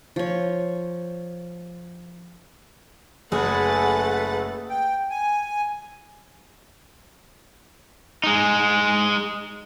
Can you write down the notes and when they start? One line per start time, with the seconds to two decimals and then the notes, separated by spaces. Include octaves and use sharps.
0.16 F3 C#5
3.32 F#1 A3 G#4 A4 B4 F#5 A6
4.70 G5
5.10 G#5
8.24 G#3 D#4